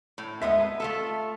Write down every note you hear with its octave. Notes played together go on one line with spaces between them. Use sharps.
A2
G#3 B3 D#5 E5
A3 F4 A4